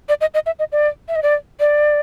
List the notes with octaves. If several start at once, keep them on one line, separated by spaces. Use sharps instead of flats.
D5
D#5
D#5
E5
D#5
D5
E5
D#5
D5
D5